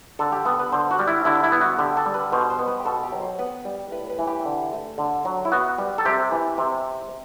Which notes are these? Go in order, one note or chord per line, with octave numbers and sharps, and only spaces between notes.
D3 A4
G4
B3 A4
B4
D3 C5
F#4
G3
E4
D3 E4
E4
B3
F#4
D3 G4
A4
G3
B4
B2 C5
C5
B3
B4
G4
B2 A4
G4
F#3
C5
B3 B4
G3
A2 B4
B4
E3
G4
D3
A3
D3
F#3
E4
B3 F#4
G3
A4
C3 G4
E3
C3